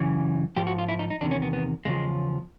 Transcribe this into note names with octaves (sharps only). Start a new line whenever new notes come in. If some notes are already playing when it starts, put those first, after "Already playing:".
Already playing: F#2 C#3 E3
G#2 F3 G4
F#4
F4
E4
D#4
D#4
E2 C3 D#3 D4
C#4
B3
B3
E2 C#3 F3 G#3